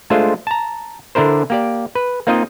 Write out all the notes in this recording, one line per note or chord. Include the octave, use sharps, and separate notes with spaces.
G#3 A3 D4 F4 C5
A5 A#5
D3 D4 E4 A#4 C5
A#3 G4 D5
B4
A#3 C4 D#4 F4 D#5